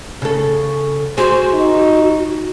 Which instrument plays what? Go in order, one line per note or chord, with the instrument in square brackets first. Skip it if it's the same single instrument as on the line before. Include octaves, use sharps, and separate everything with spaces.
[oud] C#3 A4
[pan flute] F#4 [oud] G#4 [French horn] C5
[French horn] D#4